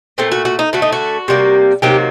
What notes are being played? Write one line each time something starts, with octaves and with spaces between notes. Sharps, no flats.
A#2 A3 C4
F#4
F#4
D#4
D3 A3 F#4
D#4
F#4
C3 G3 A#3
C3 D#3 F#3 A#3 G4